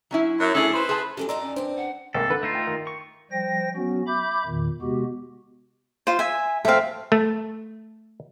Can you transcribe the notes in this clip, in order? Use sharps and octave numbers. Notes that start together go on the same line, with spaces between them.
F#3 C#4 E4
F#2
D2 C#4 E4 G#4 A4
B4 C5
G#4 A5
E3 F#3 G#3 C#4 G4 A4
F2 D#4 D5 D#5 A#5 C6 E6
C#4
G2 C4 D4 C5
F#5
C2 G#3 A#3 A4
D3 B4
A3 D#4 F4
G5
D#3
C#6
F3 G3 C5 G5 A#6
F#3 B3 C#4 F#4
E5 B5 D6 G6
E2 A#2 D#3
C3 G#3 B3 F#4 G4
F4 C5
E5 G#5
A3 C4 E5 F5
A3